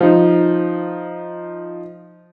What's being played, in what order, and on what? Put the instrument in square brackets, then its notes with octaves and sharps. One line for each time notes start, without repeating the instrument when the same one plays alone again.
[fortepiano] F3 D#4